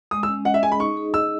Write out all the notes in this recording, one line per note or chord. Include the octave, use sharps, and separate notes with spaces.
G#3 D#6
E6
C#4
D#5 F#5
E5
G#4 G#5
B5
D#4 C#6
G#4
D#5 E6